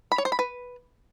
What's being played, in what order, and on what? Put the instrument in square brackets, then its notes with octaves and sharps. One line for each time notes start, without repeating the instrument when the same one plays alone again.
[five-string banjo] B5
C#5
C5
B5
B4